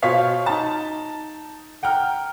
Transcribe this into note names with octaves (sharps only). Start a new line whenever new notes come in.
B2 F4 C5 C#5 F5 B6
D#4 A5
F#5 G5 A#5 F6